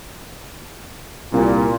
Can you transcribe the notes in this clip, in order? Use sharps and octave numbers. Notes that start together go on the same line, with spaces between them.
C2 A#2